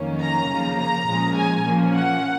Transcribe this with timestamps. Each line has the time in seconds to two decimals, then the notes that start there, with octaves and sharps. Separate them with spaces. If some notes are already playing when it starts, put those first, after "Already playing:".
Already playing: F2 D#3 F#3 A#3 C#4
0.22 A#5
0.50 C#3 F3 A#3
0.79 A#5
1.08 A#2 F3 G#3 C#4
1.36 G#5
1.64 A#2 F3 A#3 C#4
1.94 F#5